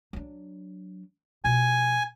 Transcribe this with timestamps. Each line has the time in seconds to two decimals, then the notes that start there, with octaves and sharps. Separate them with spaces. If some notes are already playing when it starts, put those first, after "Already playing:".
0.13 F#3 D4
1.44 B2 F3 G#5